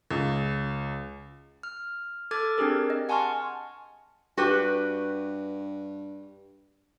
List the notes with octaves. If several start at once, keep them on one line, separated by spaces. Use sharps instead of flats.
C#2
F6
A4 D6 F6 G#6 A6
C4 D4 G4 G#4 A#4
D#5
F#5 G#5 A5 C6 C#6 F6
G2 F#4 G4 B4